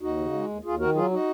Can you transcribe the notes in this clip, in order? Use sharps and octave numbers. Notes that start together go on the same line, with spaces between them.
D#2 D#4 F#4
C#3
G#3
D#2
D#2 F4 G#4
D#3 F#4 A#4
F#3 F4 G#4
D#4 F#4